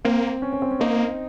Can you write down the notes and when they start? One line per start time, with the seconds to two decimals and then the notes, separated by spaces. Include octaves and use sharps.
0.05 A#3 C4
0.42 C#4
0.53 C#4
0.62 C4
0.71 C#4
0.80 A#3 C4 D#4